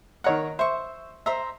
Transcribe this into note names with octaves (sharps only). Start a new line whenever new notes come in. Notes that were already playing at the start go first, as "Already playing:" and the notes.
D#3 C#5 F#5 A#5
C5 E5 C#6
C5 E5 A#5